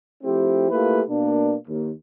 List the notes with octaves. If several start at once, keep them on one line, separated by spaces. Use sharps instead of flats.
F3 A3 C4 E4 G4
A3 A#3 E4 F4 G4 B4
B2 A#3 D4
D#2